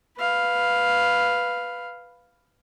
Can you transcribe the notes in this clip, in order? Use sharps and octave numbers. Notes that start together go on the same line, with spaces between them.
B4 F5